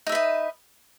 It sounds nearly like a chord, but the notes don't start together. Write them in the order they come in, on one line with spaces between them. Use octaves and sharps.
D#4 E5 B4 D#5